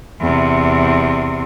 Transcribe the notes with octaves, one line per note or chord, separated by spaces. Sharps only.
E2 C3